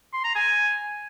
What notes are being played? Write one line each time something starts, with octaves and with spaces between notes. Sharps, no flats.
C6
A#5
G#5